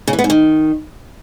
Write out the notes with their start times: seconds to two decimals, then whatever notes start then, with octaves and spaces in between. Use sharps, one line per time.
0.08 C#3
0.13 E3
0.19 B3
0.24 G#2
0.30 D#3